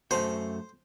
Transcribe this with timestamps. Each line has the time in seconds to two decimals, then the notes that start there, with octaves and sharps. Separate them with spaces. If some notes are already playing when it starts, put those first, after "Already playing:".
0.11 F#2 A3 F#4 C5